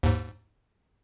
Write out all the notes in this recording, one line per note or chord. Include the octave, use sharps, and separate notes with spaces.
D#2 G#2